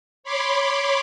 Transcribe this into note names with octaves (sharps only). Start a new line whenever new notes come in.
C#5 B5 C6 D6